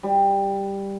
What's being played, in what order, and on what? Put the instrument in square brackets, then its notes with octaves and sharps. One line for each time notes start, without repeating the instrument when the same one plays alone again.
[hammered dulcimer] G3